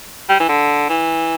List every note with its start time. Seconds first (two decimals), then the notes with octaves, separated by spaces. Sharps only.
0.29 G3
0.40 E3
0.49 D3
0.89 E3